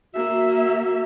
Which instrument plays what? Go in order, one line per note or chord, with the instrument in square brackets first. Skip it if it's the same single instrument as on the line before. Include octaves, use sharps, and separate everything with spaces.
[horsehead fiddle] A#3 E5 [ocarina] F#4